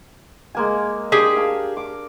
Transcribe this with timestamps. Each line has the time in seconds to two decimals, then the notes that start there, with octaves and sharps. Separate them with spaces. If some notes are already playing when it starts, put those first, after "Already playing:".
0.55 G#3 A#3 G#5
1.12 D4 G4 G#4
1.36 A#4 F5 A5
1.77 D6